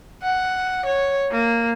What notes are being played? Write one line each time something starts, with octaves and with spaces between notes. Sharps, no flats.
F#5
C#5
A#3